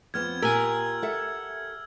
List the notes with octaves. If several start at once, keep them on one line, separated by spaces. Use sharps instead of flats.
F2 B3 C4 F6 G#6
A#2 G4 A#4 G#5 E6
A4 E5 F#5